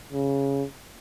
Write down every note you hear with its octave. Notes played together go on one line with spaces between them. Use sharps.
C#3